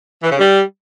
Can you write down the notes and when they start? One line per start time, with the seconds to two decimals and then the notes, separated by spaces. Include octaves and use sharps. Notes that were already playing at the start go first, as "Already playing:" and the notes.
0.23 E3
0.31 C#3
0.39 G3